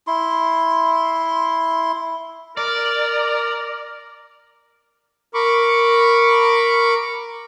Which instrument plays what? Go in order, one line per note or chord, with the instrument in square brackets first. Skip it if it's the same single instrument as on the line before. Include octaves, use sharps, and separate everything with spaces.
[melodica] E4 C6
[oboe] A#4 [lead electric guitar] D5
[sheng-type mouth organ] A#4 B5 C#6 D6